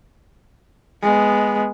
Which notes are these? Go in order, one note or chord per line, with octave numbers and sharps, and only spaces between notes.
G#3 B3